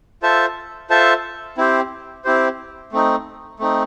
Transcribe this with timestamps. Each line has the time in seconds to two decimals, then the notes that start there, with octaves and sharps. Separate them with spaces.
0.23 F4 A4 C5 E5 A5
0.90 F4 A4 C5 E5 A5
1.58 C4 E4 G4 C5
2.24 C4 E4 G4 C5
2.92 A3 C4 D#4
3.60 A3 C4 D#4